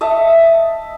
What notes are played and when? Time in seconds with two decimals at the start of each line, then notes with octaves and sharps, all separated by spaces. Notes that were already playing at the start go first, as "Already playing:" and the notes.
0.01 D#5 E5 A5